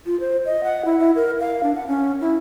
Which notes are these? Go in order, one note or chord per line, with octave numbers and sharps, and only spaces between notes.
F4
C5
D#5
F#5
E4
E4
A#4
F5
D4
F#5
C#4
E4